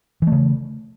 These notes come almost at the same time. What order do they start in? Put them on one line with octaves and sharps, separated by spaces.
E3 A3 C#3